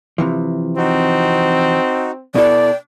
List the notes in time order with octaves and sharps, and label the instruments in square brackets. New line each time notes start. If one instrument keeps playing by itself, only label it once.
[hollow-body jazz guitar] C3 E3 F3
[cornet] C4 [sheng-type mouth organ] D#4 F#4
[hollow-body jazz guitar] B2 E4 A4 [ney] D5 [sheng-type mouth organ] G5